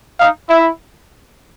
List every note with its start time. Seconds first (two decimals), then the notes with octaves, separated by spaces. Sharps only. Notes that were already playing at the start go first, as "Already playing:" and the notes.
0.20 D#4 F5
0.49 E4 E5